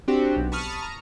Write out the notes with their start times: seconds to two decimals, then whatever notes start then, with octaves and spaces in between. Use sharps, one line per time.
0.08 C4 D4 F#4 G4
0.36 B1
0.52 A5 B5 C#6 D#6 F6
0.82 A#5